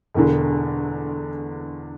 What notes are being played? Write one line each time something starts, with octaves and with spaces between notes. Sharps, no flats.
E1 E2 D3